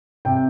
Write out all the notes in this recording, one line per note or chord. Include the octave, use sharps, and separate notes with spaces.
C3 G5